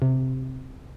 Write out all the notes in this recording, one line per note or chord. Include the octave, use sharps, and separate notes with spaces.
C3